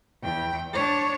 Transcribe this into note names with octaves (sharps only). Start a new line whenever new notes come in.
E2 G5
D4 C#5